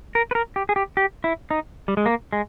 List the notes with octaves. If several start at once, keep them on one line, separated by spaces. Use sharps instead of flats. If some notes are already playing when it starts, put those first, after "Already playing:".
A#4
B4
A#4
G4
G#4
G4
G4
E4
D#4
G3
G#3
A#3
G#3